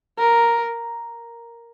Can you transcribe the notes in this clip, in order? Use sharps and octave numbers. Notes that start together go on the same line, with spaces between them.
A#4